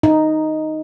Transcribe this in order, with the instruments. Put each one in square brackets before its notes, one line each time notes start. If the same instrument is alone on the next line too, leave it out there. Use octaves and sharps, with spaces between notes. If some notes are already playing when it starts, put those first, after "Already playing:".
[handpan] D#4